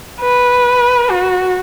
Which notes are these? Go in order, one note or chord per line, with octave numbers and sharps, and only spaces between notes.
B4
F#4